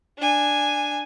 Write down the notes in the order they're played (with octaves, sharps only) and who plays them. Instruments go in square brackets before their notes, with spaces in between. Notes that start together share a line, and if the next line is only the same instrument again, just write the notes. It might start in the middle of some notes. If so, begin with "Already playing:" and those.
[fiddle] D4 G#5